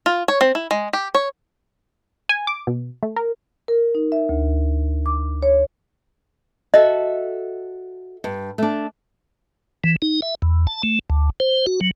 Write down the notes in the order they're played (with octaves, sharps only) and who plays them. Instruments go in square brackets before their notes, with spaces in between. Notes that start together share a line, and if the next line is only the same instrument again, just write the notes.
[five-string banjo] F4
C#5
C4
E4
G#3
G4
C#5
[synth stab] G#5
D6
B2
A3
A#4
[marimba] A#4
D#4
E5
D2
D6
C#5
[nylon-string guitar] F#4 A4 E5 [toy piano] D#5
[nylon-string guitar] G2
A3 D4
[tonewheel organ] E3
D#4
E5
E2
A5
A3
D2
C5
F#4
F#3